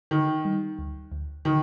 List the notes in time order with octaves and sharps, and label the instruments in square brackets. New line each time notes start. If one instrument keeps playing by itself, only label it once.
[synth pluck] D3 [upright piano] D#3
[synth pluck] G3
D2
D2
[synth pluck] D3 [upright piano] D#3